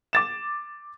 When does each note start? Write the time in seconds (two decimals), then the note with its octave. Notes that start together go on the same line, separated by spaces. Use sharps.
0.13 D6 A6 E7